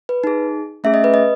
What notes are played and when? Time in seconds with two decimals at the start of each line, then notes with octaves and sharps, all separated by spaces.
0.09 B4
0.24 D#4 G#4
0.84 A3 C#4 G#4 E5
0.94 D#5
1.04 B4
1.14 D#5